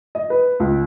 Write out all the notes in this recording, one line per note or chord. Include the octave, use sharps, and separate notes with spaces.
D#5
B4
C#2